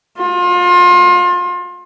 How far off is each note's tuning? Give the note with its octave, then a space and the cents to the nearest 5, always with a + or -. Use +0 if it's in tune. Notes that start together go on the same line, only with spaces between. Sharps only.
F4 +30